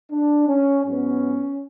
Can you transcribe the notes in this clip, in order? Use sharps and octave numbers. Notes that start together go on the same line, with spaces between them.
D4
C#4
G#2 F#3 B3 C#4